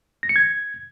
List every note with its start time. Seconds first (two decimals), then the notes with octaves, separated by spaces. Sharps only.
0.23 A#6
0.29 C#7
0.36 G#6